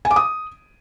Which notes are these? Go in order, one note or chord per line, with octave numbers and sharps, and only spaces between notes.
G#5
D6
D#6